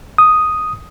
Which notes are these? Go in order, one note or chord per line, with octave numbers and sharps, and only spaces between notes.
D#6